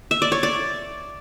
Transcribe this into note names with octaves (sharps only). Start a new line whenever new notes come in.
E5
D5
C#5
D5